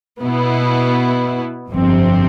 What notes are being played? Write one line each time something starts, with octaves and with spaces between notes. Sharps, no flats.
B2 B3 E4
G1 F2 C3 F3 C4